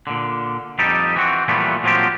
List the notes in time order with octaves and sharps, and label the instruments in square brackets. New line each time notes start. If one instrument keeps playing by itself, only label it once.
[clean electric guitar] A#2 D3
F2 G3 D#4 G4 A4
E3 C4 F#4
A#2 E3 F3 G3 A3 B3
A#2 F3 F#3 C4 F4 G4